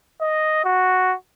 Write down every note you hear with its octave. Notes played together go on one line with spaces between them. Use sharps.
D#5
F#4